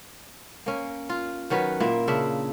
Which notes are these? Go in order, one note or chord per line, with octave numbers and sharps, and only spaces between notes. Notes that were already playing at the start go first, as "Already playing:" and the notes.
A#3 C#4
F4
D#3 F#3 C#4 B4
A#2 A#3 E4 E5
C#3 D4 E5